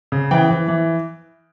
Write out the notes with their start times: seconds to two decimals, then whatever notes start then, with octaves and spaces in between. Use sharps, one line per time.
0.12 C#3
0.31 E3 G5
0.50 E3
0.68 E3